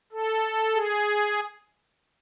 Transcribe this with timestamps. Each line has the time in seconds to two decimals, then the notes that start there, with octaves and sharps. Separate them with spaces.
0.12 A4
0.75 G#4